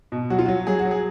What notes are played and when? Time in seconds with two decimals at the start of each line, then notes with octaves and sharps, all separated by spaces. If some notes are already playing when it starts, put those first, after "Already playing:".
0.12 B2
0.30 F#3 F#4
0.39 F4
0.46 F#3 F#4
0.67 F#3 G#4
0.79 F#4
0.85 F#3
0.91 G#4